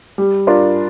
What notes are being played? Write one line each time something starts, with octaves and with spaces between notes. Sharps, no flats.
G3
D4 F4 A#4